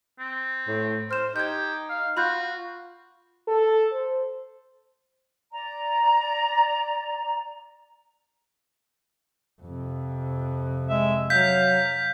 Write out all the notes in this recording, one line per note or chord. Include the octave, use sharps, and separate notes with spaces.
C4
A2
C5 F6 G6 E7
D#4 G4 G6 G#6
F5
F4 F#4 B5 F#6 G6
A4
C5
D5 A#5
F2 C3
G#3 E5
F#3 F5 G6 B6